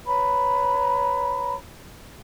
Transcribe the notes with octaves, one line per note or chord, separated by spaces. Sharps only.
B4 C#5 A#5 B5